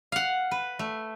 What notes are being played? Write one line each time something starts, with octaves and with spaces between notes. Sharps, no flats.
F5 F#5
B4
A3